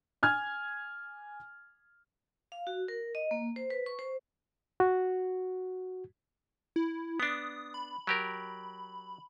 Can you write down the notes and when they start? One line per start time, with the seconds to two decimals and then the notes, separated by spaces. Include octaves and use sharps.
0.23 G#5 F6 G#6
2.52 F5
2.67 F#4
2.88 A#4
3.15 D#5
3.31 A#3
3.56 C5
3.70 B4
3.86 C#6
3.99 C5
4.80 F#4
6.76 E4
7.20 B3 D4 D#6
7.74 B5
8.07 F#3 G4 A#4